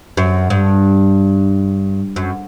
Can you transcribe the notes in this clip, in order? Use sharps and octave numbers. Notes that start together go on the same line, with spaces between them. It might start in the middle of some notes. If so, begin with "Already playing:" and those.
F#2
G2
F#2